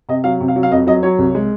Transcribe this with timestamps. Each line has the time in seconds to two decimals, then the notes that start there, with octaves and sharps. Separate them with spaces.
0.09 C3 D#5
0.24 F#3 F5
0.41 C3
0.48 F5
0.56 F#3
0.63 F5
0.71 F2 D#5
0.87 F#3 D#5
1.03 F#3 C#5
1.19 C2
1.35 G#3